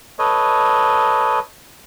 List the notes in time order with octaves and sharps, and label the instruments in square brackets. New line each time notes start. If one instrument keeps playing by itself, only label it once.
[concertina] A4 B4 C#5 D#5